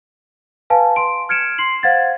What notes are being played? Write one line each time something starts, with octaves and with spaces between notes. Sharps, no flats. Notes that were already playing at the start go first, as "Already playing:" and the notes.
B4 F5 G#5 A5
C6 D7
F6 G#6 C#7 D7 E7
C6 C7 F#7
C5 F5 F#5 G#6 A6